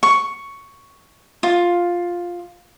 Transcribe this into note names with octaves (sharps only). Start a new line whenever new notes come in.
C#6
F4